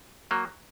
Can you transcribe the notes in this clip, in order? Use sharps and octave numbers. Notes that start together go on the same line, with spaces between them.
F#3 A#3